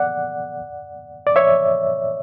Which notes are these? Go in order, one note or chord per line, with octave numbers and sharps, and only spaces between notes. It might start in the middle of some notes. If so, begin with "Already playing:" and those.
Already playing: D5 F#5
D5
C#5 E5